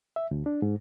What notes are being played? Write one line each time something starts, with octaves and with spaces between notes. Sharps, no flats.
E5
D2
D4
G#2